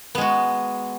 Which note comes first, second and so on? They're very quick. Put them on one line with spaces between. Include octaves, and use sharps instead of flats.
B3 G#3 F#4